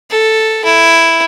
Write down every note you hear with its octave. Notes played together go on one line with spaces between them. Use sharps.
A4
E4